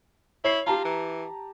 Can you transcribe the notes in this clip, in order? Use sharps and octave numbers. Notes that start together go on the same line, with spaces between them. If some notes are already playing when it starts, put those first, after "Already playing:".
E4 C#5 C7
F4 G4 A5 A#5
E3